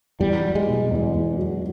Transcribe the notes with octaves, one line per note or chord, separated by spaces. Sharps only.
E2 G3
F#3
G#3
B2
E2
E2
F#3